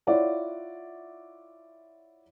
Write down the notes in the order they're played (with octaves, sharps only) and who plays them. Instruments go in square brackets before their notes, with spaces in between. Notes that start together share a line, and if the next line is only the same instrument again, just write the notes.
[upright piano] E4 F4 C#5 D5 E5 F#5